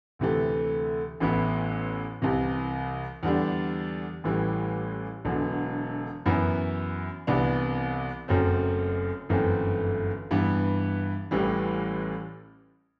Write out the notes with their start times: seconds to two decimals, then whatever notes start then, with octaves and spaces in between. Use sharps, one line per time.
0.19 D2 C3 E3 A3
1.20 A1 A2 E3 B3 E4
2.22 C2 C3 E3
3.23 E2 D3 G3 D4
4.24 A1 A2 E3 G3
5.25 E1 E2 D3 F#3
6.26 F#2 E3 B3 E4
7.27 C2 C3 E3 B3 D4
8.28 F#1 F#2 F#3 A3 C4
9.29 G1 F#2 E3 A3 C4
10.31 G2 E3 B3
11.31 A1 A2 E3 G3